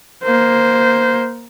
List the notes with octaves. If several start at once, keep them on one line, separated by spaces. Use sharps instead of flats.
A#3 C5